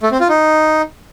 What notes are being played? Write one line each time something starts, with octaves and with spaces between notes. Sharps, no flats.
A3
C4
F4
D#4